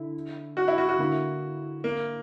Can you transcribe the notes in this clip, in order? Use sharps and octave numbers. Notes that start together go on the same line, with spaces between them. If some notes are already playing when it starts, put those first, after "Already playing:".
Already playing: D3 E4
F#4
E4
F#4
F#4
D3 A#3 E4
A#3